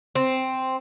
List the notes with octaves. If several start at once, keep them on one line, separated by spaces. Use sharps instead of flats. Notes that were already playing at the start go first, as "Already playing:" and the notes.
C4